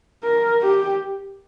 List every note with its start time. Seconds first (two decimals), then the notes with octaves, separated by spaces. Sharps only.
0.23 A#4
0.62 G4